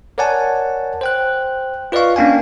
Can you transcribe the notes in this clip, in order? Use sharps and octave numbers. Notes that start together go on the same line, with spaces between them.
A#4 C#5 D5 F#5 G#5 A5
C5 G5 F#6
F4 B4 D5 D#5 F5 C#6
A#3 C#4 D4 F5 G5 G#5